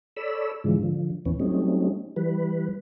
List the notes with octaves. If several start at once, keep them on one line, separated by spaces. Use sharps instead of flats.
A4 C#5 D5 B5 E6
G#2 D3 E3 F3 G#3
D3 F3
E2 A#2 E3 B3 C#4
F#3 G3 A3 C4 C#4 D#4
E3 G3 B4